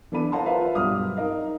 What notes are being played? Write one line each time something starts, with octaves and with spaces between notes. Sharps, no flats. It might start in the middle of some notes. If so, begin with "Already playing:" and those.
E3 B3 D4 A4 B5 D#7
C5 F5 F#5 A5 A#5 C6
F4 A#4 B4 E5 F5
B1 G2 D#6 F6
D#4 A#4 D#5 F5